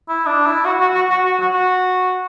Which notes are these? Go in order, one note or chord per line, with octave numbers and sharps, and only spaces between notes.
E4
D4
E4
F#4
F#4
F#4
F#4
F#4
F#4
F#4